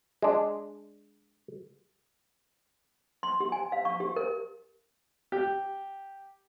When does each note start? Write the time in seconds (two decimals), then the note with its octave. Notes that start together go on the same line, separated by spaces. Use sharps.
0.22 G#3 D4
3.23 C6
3.40 G4
3.52 G#5
3.72 F5
3.85 C#6
4.00 G4
4.16 A#4
5.32 G4